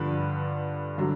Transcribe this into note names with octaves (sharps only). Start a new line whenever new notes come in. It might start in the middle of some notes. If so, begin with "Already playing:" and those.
Already playing: G2 D3 F3 B4
D3 F#3